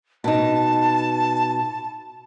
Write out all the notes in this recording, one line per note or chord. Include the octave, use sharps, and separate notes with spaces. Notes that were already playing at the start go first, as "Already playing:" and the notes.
B2 D#4 A5